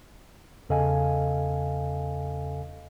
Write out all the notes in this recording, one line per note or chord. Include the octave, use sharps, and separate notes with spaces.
E2 C#3 A4 D#5 F5 G#5